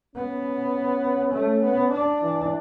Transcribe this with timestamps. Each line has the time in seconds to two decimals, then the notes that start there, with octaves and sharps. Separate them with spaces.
0.15 B3 C#4
1.33 A3 C#4
1.63 B3
1.92 D4
2.22 E3